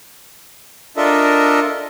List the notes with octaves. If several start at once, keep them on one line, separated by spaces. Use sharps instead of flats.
D4 F4 A4 A#4 D#5 E5